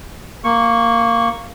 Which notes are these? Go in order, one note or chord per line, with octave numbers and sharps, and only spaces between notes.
A#3 C#6